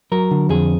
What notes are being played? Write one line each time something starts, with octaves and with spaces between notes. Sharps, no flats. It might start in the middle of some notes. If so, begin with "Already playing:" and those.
F#3 A#4
D3
F2 G#4